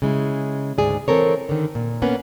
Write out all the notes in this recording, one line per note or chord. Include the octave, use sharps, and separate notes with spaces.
C#3 G#3 E4
D2 G#2 G#4 D5
E3 C4 A4 A#4 C#5
D3 D#3
A#2
A#3 B3 C#4 B4